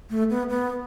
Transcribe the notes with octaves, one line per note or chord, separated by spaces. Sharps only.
A3
B3
B3